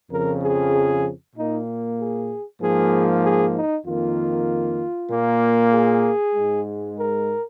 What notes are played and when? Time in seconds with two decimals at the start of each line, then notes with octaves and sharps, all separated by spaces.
0.11 F2 C#3 F3 A#4
0.42 G#4
1.36 A#2 A#3 D#4
1.99 G#4
2.61 G#2 F3 A#3 G#4
3.23 G#4
3.55 D#4
3.86 F2 D#3 A#3 F4
5.11 A#2 A#3
5.73 G#4
6.35 G#2 G#3
6.98 A#4